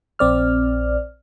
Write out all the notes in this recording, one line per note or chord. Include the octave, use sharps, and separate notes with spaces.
A#1 C4 D5 F6